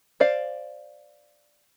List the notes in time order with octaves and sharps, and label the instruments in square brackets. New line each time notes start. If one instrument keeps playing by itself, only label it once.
[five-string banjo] C5 D5 F5